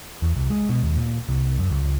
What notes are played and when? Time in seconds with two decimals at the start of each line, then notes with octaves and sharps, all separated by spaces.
0.22 E2
0.36 C2
0.50 G#3
0.69 B2
0.83 D#2
0.97 A#2
1.29 C2
1.58 F#2
1.70 C#2